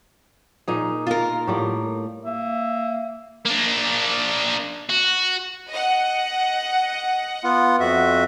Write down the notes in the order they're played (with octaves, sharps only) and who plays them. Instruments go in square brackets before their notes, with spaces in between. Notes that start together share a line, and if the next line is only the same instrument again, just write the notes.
[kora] A#2 D#4 G#4
[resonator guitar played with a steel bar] F4 A#4
[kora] A2 G3 A#3
[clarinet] A#3 [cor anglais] E5
[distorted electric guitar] A#3 D4
F#4
[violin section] D#5 F#5
[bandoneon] B3 F4 F#5
F2 F#4 E5